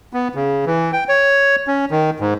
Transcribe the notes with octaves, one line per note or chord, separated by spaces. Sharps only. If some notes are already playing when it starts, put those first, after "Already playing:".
B3
C#3
E3
G5
C#5
C#4
D#3
G#2